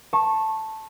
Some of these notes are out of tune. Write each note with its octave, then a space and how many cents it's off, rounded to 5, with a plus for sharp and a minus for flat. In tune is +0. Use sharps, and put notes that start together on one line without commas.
A5 +0 C#6 -25